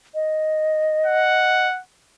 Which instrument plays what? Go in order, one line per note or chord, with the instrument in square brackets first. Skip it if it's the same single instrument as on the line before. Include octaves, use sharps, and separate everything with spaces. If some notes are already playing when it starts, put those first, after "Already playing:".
[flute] D#5
[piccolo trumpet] F#5